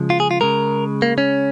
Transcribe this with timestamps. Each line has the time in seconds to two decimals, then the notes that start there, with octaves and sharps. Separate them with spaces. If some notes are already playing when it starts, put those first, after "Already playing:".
Already playing: C#3 F3 G#3
0.10 F4
0.20 G#4
0.31 F4
0.41 C#3 G#3 A#4
1.02 A#3
1.18 C#4